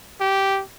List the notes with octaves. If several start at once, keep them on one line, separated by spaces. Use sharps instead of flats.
G4